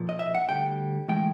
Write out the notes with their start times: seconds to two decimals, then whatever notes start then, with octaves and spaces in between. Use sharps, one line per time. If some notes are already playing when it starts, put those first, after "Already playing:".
Already playing: B1 A#2 F3
0.09 D#5
0.19 E5
0.35 F#5
0.49 D2 D3 G3 G5
1.08 A2 E3 G#3 G5